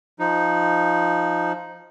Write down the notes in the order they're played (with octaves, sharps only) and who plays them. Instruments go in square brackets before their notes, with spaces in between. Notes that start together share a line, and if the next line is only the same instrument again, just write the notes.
[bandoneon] F3 D#4